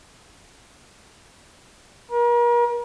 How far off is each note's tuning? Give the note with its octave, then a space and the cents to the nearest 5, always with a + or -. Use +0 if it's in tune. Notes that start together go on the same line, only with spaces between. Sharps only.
A#4 +40